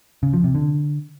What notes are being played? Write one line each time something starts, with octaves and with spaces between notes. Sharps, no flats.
C#3
F3
C3
D3